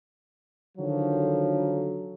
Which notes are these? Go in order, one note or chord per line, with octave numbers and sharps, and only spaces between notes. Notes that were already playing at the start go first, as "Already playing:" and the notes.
D3 D#3 F3 F#3